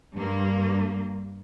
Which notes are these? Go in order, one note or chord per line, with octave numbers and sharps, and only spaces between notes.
G2 A#3